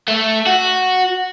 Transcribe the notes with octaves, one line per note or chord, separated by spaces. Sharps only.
A3
F#4